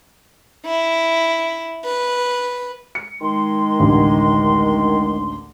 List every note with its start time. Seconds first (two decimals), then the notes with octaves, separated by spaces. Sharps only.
0.66 E4
1.85 B4
2.95 C#7
3.21 D#3 G#3 C6
3.80 A1 D2 D3